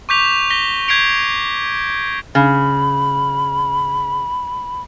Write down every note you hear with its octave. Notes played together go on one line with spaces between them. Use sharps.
C#6 D6 G6 B6 F7
A#6 B6 G7
G6 G#6 B6 C7 D7 F7
C#3 B5